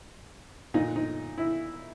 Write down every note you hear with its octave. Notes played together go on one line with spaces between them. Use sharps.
A#2 D#4
D#4
E4